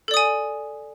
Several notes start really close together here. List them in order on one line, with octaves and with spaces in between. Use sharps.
A4 D5 D#6 G#5